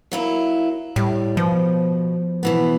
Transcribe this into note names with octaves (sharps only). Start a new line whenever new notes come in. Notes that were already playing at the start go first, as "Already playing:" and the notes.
F#3 A#3 E4
A2 G3
B2 F3
B2 E3 B3